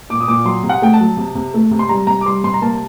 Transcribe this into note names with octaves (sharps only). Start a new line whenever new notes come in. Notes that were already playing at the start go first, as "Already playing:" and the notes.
A#2 D6
D#6
A#2 D6
F#3 C6
C3
F#5
A3 G5
A5
F#3
C3
C3
A3
C3
C6
G3 A#5
C3 A#5
D6
G3 C6
C3 C6
A#5
A#3 A5